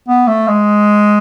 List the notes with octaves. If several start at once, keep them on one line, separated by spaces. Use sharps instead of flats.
B3
A3
G#3